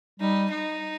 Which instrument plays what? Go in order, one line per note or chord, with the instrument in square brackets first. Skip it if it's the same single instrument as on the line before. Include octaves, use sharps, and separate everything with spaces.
[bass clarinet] G3 [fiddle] D#4
[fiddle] D#4